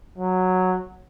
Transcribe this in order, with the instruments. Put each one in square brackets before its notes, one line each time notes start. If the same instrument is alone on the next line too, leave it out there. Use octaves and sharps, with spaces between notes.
[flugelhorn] F#3